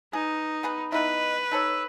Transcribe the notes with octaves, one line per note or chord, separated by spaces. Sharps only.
D#4 G#4 B4
B3 G#4 B4
B3 D#4 E4 B4 D#5
D#4 A4 C#5 E6